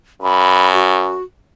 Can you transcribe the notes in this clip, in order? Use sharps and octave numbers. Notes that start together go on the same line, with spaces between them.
F#2 B5
F#4